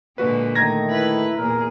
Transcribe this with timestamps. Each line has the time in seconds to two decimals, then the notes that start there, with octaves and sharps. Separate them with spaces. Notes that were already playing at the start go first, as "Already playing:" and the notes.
0.18 A#2 D3 G#3 F#4 B4
0.55 D#3 A3 A#5 G#6 A#6
0.90 E4 B4
1.38 E2 A#2 G#4 A#4